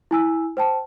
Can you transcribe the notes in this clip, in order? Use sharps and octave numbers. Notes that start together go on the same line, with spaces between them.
E4 G#5 E6
C5 G5 A5